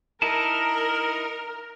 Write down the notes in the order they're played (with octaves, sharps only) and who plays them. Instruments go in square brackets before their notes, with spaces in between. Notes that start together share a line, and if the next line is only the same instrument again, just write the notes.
[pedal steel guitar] D#4 E4 A5 [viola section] A#4